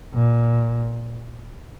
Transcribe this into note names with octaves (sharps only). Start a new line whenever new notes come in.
A#2